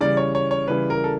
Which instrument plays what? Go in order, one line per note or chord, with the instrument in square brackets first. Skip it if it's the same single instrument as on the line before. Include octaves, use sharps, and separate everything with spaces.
[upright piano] C#3 E3 G3 D5
C#5
C#5
C#5
C#3 E3 G3 B4
A#4
A4